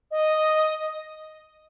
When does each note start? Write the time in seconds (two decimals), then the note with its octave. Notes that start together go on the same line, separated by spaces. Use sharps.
0.11 D#5